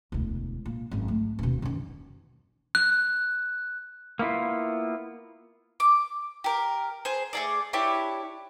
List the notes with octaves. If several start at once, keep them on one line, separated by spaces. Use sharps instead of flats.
E1 D2
A#2
G#1 F#2
A3
D#1 B2
F#2 D#3
F#6
A#3 B3 E4 F4
D6
G4 A#4
G#4 C5
A3 G#4 D5
D4 E4 G4 C#5